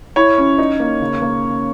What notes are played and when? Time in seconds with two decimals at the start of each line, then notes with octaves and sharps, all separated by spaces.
0.16 E4 C#5
0.38 C#4
0.58 D#4
0.80 A#3
1.01 C#3
1.22 A#3